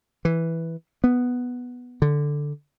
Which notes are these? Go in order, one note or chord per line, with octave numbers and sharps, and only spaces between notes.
E3
B3
D3